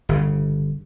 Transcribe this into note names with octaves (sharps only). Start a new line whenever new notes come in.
G1 C#3